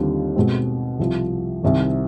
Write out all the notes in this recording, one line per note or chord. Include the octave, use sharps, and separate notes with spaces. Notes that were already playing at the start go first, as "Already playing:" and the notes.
Already playing: D#2 D3 G3 C4 F4
B2 G#3 C4
C2 C3 F3
C2 C3 D#3